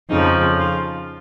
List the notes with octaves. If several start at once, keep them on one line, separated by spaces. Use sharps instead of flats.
F2 C#3 F3 D#4
F4